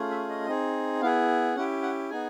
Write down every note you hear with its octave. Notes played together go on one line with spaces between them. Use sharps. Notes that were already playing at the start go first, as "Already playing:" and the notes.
Already playing: A3 C#4 F4 G#4
E5
D#5
C4 D#4 G#4
B3 E4 G#4 F5
C#4 E4 G4 F#5
F#5
B3 D#4 G#4 G#5